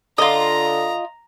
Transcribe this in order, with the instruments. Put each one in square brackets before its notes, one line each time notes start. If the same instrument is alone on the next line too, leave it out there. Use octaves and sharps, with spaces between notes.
[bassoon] D3 [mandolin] F4 D#5 [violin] A#5